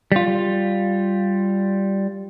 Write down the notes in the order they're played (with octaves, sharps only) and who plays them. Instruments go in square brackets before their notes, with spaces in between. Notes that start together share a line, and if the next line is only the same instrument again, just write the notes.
[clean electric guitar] G3 F4